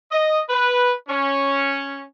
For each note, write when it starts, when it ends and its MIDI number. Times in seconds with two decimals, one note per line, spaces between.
0.11 0.39 75
0.50 0.92 71
1.08 2.02 61